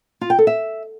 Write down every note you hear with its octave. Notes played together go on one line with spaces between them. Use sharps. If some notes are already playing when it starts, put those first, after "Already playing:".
F4
G5
A4
E5